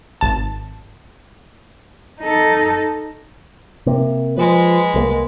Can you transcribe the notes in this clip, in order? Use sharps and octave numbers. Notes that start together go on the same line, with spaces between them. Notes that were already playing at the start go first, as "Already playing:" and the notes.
G#1 A5
D#4 A4
C3 A#3
F3 G#3 B4
C2 G3 A#3